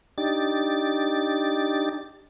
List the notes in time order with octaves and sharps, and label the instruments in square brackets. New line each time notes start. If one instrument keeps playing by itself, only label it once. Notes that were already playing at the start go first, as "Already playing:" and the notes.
[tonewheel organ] D4 D#4 G4 A6